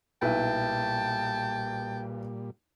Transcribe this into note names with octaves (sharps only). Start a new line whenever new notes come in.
B1 A#2 G3 E4 B4 G5 A5